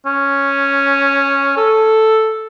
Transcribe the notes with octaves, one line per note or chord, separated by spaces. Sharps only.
C#4
A4